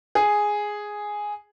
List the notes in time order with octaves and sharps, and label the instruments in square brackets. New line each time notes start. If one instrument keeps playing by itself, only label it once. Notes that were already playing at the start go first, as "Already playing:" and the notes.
[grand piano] G#4